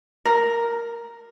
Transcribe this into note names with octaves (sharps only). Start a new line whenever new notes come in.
A#4